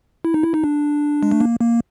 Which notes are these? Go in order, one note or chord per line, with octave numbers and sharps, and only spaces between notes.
E4
D#4
E4
D#4
D4
G#3
A3
A#3
A#3